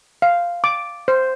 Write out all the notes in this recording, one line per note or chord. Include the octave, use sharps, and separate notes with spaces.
F5
D6
C5